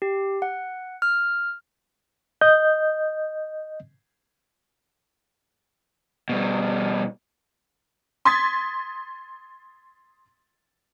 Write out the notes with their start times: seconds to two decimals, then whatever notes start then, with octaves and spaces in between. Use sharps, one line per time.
0.02 G4
0.42 F#5
1.02 F6
2.41 D#5 G6
6.29 B2 G3
8.25 C6 D#6 G#6 A6 B6